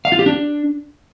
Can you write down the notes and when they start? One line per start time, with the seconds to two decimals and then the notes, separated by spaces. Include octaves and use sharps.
0.05 F5
0.12 F4
0.19 G4
0.26 D4